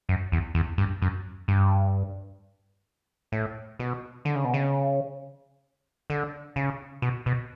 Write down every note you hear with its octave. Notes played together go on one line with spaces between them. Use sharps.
F#2
E2
E2
G2
F#2
G2
A2
B2
D3
C#3
B2
C#3
D3
C#3
B2
B2